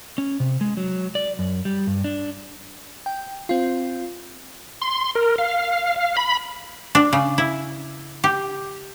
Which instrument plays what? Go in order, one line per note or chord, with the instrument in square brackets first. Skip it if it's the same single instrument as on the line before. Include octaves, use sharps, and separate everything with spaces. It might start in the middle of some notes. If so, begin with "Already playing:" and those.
[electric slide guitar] C#4
C3
G#3
F#3
D5
F#2
G3
G2
D4
[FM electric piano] G5
C4 F4
[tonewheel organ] C6
A#4
F5
F5
B5
[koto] D4
C#3
E4
G4